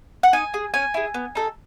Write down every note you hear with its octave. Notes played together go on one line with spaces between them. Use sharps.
F#5
D#4 G#5
G#4
C#4 G#5
E4 G#4
B3
D#4 A4